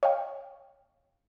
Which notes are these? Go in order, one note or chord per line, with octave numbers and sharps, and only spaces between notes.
C#5 D#5 F5 G5